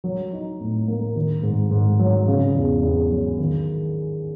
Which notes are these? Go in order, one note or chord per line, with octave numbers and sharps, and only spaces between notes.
F#3
D#4
A2
A#3
D#3
G#2
G#2
F#3
C#3
E2
E2
F#3
D#3